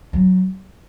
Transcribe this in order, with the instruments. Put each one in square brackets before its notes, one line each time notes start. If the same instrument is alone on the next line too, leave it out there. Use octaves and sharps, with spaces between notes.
[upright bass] F#3